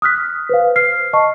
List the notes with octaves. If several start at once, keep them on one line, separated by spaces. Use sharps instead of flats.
D#6 F6 F#6 B6
B4 C5 F5
F6 C7
D#5 A5 C#6